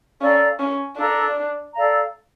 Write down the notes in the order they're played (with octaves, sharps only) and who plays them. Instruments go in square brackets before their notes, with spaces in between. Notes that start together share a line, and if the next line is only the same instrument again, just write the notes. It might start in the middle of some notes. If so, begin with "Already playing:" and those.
[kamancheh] C#4 [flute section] A4 D5 F5 A#5
[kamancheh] C#4
[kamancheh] D4 [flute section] A4 D5 F5 A#5
[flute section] A4 D5 F5 A#5